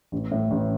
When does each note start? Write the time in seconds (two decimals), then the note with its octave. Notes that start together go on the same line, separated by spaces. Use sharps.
0.12 A1
0.31 A2
0.51 A1